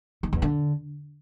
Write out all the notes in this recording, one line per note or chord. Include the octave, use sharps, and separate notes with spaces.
D#3
E2
D3